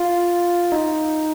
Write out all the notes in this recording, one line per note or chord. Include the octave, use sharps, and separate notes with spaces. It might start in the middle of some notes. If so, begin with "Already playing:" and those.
Already playing: F4
D#4